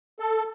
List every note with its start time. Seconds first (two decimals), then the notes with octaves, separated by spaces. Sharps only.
0.20 A4